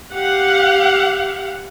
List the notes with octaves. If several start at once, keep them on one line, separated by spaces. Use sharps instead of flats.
G4 F5 F#5